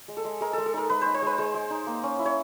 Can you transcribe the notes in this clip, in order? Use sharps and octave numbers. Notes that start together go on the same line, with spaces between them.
G#3
A4
G#3
G#3 A#4
G#3 A4
A4
D#4 A#4
G#3 B4
D#4 C5
C5
G#3 B4
G#3 C5
G#3
D#4
A#3
C#4
E4
C#5